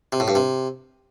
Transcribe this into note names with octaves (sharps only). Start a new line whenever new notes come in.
C3
A2
G2
C3